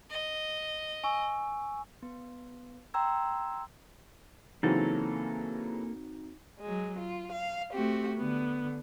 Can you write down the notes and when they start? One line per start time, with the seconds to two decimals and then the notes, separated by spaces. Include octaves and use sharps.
0.11 D#5
1.04 G#5 C#6 E6
2.03 B3
2.94 G5 A#5 C6 E6 G#6
4.63 C#3 E3 F#3 A#3 C4 D#4 F#4 A4
6.60 F#3 G#3
6.98 F4
7.31 F5
7.73 A3 C4 F#4 G4
8.17 D3 B3